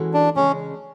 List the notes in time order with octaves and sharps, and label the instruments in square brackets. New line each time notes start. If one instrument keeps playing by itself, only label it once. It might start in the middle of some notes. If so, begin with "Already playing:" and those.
Already playing: [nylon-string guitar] E3 G#3 C#4 F#4 A4
[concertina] D4
[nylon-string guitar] C#3 G#3 [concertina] C#4